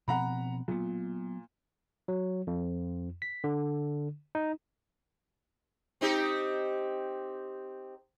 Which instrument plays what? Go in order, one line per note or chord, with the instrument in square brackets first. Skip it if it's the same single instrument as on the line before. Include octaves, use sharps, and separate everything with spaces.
[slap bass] B2 F3 C4 [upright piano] F#5 A#5 B5
[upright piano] A#2 [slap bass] F#3 B3
[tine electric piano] F#3
F2
B6
D3
D#4
[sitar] C4 D#4 G4